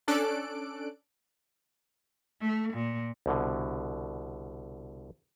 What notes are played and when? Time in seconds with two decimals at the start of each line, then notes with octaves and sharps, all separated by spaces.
0.08 C#4 D4 A4 D5 F#6 D7
2.41 A3
2.73 A#2
3.26 C2 B2 D3